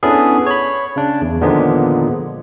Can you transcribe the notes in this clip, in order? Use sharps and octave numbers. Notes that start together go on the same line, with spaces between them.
B3 C#4 D4 E4 G#4 A4
C#5 B5
C#3 D4
E2
A#2 D3 D#3 F3 G#3 B3